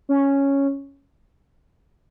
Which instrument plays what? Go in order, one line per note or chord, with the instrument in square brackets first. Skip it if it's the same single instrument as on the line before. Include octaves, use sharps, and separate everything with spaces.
[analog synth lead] C#4